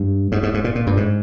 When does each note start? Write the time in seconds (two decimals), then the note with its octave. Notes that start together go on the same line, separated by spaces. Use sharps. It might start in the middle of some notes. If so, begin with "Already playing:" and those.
Already playing: G2
0.32 G#2
0.43 G#2
0.54 G#2
0.64 A#2
0.75 A#2
0.87 G2
0.97 G#2